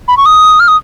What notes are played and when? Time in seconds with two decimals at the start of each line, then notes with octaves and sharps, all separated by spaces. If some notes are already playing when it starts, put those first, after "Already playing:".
0.08 B5
0.17 C#6
0.26 D#6
0.60 F6
0.68 D#6